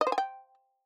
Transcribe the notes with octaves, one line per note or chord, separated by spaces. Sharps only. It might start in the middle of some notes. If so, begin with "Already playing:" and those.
D#5
C5
G#5
G5